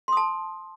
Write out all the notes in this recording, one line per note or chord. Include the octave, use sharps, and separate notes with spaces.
A5 C6 D#6